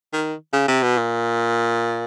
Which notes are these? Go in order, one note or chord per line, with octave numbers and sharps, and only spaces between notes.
D#3
C#3
C3
B2
A#2